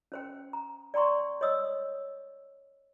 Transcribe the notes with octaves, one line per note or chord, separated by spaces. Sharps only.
C#4 C5 G5
A#5
D5 G5 A#5 C6 C#6
C#5 D#5 D#6 E6